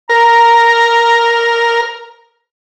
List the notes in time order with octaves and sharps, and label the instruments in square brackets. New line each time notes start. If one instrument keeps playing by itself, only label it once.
[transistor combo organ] A#4 [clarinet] A#5